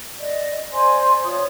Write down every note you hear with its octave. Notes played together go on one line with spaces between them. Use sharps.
D5 D#5
C5 D5 G#5 C6
F4 C#5 D#6